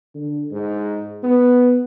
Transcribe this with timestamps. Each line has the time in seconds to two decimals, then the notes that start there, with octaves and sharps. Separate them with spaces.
0.15 D3
0.51 G#2
1.23 B3